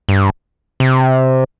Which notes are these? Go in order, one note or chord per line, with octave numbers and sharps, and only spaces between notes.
G2
C3